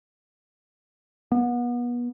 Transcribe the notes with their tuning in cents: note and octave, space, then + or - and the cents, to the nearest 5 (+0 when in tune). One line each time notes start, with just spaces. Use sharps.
B3 -30